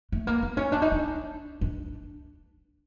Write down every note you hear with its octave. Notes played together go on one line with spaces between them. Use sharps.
A3
A#3
B3
C#4
D4
D#4
D4
D4